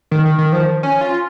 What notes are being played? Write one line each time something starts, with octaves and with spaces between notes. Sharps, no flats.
D#3
D#3
D#3
F3
C#4
F4